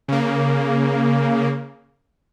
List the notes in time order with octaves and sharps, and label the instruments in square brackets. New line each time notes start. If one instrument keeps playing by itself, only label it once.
[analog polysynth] C#3 A#3